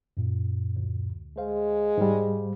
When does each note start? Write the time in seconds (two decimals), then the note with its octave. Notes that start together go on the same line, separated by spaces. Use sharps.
0.17 F#2 A#2
0.76 D2
1.38 G#3 C5 F5
1.98 G#2 G3